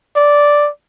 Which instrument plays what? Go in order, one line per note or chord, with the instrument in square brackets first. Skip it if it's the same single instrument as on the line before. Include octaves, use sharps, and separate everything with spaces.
[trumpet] D5